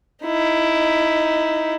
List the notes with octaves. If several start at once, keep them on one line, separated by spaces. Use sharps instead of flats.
D#4 E4